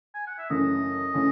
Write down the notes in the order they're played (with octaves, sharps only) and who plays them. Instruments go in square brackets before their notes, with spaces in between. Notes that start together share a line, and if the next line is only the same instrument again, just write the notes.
[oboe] G#5
F#5
E5
[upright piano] F#2 C#3 E3 A3 C#4 [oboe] D#5
[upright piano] C#3 E3 A3 C#4